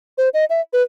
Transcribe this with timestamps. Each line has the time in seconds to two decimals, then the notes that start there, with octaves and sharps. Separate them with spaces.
0.18 C5
0.34 D#5
0.50 E5
0.73 B4